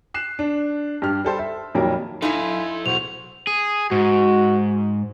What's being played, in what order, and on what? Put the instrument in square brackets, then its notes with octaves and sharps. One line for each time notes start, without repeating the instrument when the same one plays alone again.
[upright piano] F#6 C7 E7
D4
G2 G4 F6
G3 A4 C5
E5
F2 A#2 D#3 F#3 G3 A#4
[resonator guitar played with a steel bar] D#4 E4 [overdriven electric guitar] A4 F5 [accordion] G#5 B5 C6
[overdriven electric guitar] B1 F#5 [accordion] E2 F#4 C5 [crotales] F7
[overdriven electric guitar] G#4
[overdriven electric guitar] G#2 [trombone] F#4